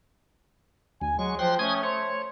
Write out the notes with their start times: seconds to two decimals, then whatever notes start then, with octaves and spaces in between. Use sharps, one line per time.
1.01 D2 G#5
1.19 F#3 G#3 C#6
1.39 F3 G5 C6 F#6
1.59 A3 C#4 D#6 G#6
1.83 C5 C#5